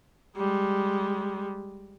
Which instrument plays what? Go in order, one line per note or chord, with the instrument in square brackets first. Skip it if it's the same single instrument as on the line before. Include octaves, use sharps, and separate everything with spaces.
[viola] G3 G#3